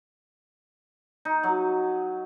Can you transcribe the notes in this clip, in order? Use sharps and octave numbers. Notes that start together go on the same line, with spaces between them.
D#4
F#3